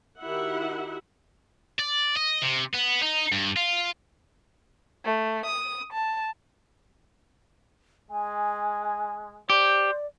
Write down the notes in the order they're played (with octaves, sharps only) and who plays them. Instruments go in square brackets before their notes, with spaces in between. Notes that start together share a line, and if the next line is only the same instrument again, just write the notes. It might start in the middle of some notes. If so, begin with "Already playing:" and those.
[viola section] D#3 E4 F#4 G4 E5 F#5
[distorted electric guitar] D5
D#5
C3
B3
D#4
G2
F4
[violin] A3
D#6
A5
[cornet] G#3 [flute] G#5
[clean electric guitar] G4 [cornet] C5 [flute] D5